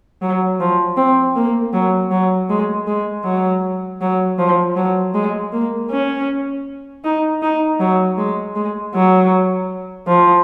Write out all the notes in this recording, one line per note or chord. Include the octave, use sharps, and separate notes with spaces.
F#3
F3
C4
A#3
F#3
F#3
G#3
G#3
F#3
F#3
F3
F#3
G#3
A#3
C#4
D#4
D#4
F#3
G#3
G#3
F#3
F3